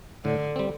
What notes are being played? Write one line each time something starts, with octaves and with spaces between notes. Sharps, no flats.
A2 D3
G3 C4